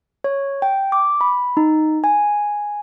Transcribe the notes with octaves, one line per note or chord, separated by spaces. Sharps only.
C#5
G5
D6
B5
D#4
G#5